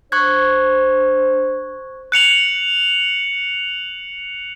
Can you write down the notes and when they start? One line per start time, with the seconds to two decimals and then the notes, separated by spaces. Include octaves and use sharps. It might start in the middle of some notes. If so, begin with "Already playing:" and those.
0.12 D4 C5 C#6 F#6 G#6
2.12 F#6 C#7 F7 F#7